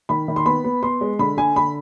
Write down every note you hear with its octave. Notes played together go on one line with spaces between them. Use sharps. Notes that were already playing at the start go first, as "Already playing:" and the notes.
D#3 B5
D#3
C6
B3 B5
B3
B3 C6
G#3
D3 B5
D3 G#5
D3 B5